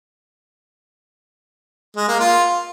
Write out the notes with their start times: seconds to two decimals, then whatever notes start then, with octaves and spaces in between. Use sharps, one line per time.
1.96 G#3
2.08 A#3
2.20 F4